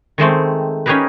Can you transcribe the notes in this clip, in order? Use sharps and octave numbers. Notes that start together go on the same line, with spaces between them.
D#3 G#3 A3 C4
C#4 D#4 G4 G#4 A#4 B4